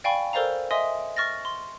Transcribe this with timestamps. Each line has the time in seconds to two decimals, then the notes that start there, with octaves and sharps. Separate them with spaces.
0.04 D5 F5 G5 G#5 B5 C#6
0.33 A4 A#4 C5 D5 F5 A#5
0.71 D#5 E5 G#5 C6 D#6
1.16 C#6 F6 A6 A#6
1.45 C6